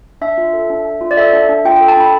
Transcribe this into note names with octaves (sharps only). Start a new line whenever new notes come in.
D4 E5
F4
A4
D4
D4
F4
D5
A4 E5
D4
D4
F4 G5
A4 G5
A5
D4 B5